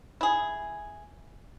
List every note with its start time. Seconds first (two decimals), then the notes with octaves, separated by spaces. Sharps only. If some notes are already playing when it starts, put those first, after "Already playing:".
0.21 E4 G#4